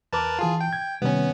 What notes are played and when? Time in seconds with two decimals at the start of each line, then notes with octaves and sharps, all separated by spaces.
0.13 E2 A#4 B4 A5 D6
0.39 E3 F4 G#4 A5
0.61 G5
0.73 G#6
1.02 C3 D#3 G3 B3 C#4